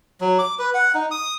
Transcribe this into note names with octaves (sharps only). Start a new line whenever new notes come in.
F#3
D6
B4
F#5
D#4
D#6